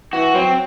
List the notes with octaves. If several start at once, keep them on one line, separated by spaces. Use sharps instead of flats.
E3 F#4
F#3 C4